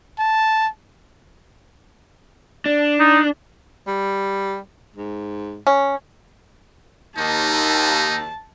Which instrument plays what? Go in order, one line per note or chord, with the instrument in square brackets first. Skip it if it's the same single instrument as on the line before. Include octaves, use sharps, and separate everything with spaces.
[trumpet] A5
[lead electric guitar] D4
[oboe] D#4
[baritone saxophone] G3
G#2
[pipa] C#4
[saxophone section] D#2 [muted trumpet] D#4 [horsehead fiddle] A5